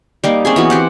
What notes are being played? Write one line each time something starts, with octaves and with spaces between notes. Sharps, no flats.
G3 A#3 D#4
C4 C#4 G#4
E3 B3 F#4
C4 G4 F#5